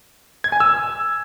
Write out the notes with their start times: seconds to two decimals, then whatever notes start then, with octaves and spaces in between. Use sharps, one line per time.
0.44 G#6
0.52 G#5
0.60 E6